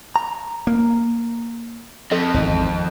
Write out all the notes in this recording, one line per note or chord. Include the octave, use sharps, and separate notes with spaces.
A#5
A#3
F2 A4 D#5
G#1 E2 D#3